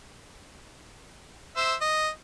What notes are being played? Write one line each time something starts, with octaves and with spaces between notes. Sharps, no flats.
C5 E5
D#5